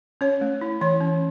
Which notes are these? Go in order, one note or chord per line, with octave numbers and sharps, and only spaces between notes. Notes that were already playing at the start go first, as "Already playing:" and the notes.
C#4 C#5
A3
E4
E3 C#5
C#4